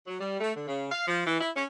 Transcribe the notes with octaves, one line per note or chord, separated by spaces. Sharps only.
F#3
G3
A3
D3
C#3
F5
F3
E3
E4
C#4